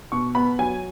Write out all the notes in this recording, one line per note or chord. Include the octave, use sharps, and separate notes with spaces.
B2 C#6
B3 B5
F#3 G#5